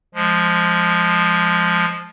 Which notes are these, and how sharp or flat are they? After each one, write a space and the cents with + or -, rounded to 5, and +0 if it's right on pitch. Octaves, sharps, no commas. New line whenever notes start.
F3 +0 G#3 +0